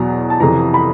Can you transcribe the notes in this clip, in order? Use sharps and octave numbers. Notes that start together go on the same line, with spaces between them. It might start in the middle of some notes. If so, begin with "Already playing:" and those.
Already playing: E2 B2 F#3 A#5
A5
F2 C3 E3 A#5
B5